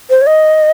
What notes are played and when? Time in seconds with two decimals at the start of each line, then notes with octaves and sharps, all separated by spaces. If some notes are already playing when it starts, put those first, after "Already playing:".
0.10 C5
0.22 C#5
0.27 D#5